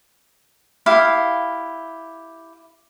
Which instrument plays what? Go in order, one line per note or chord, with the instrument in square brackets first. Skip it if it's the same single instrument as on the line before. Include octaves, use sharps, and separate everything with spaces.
[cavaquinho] E4 G4 F5